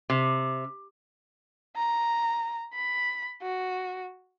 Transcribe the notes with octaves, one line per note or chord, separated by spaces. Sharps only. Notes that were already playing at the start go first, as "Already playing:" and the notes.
C3
A#5
B5
F#4